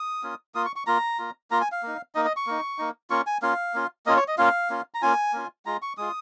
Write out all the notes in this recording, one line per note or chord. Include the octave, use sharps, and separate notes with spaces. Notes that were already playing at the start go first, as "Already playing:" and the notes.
Already playing: D#6
A#3 C#4 F4
A#3 F4 D#6
C#6
C#6
A#3 F4 A#5
A#3 F4
A#3 F4 A#5
G#5
F5
A#3 D#4
A#3 D#4 D#5
D#5
C#6
A#3 D#4
A#3 D#4
A#3 C#4 F4 C#6
G#5
A#3 C#4 F4 F5
A#3 C#4 F4
A#3 C#4 F4 D#5
C#5
D#5
A#3 C#4 F4 F5
A#3 C#4 F4
A#5
A#3 C#4 F4 G#5
A#3 C#4 F4
G#3 F4 A#5
C#6
G#3 F4 D#6